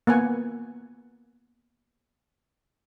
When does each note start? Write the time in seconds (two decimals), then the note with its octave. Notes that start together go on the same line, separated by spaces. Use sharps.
0.07 A#3 B3 F#5 G#5